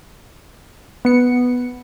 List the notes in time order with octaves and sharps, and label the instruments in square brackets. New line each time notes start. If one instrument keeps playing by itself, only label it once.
[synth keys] B3 C#7